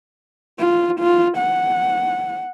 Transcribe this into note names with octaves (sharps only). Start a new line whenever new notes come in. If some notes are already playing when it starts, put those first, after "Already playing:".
F4
F4
F#5